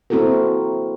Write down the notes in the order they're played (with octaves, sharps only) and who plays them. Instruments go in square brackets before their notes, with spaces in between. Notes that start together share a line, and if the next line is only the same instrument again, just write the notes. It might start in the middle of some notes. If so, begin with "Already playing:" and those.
[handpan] A#3 C4 E4 F#4 A4 A#4